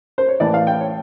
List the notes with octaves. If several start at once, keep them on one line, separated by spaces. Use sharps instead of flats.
C5
C#5
A2 E3 D5
F5
G5
C#5